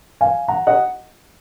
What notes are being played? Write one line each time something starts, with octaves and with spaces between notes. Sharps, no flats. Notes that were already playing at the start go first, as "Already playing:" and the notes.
F5 G#5
F#5 A#5
D#5 F#5